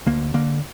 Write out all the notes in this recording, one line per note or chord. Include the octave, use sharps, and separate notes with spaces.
D2 A#3
D3 A#3